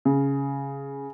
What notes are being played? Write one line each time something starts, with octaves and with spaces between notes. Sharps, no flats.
C#3